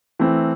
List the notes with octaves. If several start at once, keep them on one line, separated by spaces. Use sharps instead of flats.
E3 A3 C4 E4